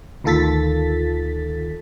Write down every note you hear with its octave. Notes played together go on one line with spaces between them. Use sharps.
D2 D#3 F4 A4 A6 B6